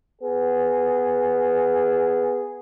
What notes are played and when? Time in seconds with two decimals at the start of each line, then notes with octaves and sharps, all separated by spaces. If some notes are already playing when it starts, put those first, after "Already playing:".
0.21 B3 G#4